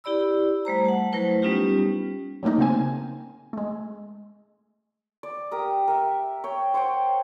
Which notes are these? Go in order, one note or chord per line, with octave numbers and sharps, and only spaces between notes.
E4 G4 D5 B5 E6
G3 A3 C5 A#5
F#5 A5
F#3 A3 E4 B4 C5
G3 B3 C#4 D#4 F4 G4
F#3 G3 A3 A#3 D#4
C#3 A#3 C4 G#5
G#3 A3
D5
G4 A#4 D#6
A#4 E5
C#5 G5
C5 C#5 F#5 G5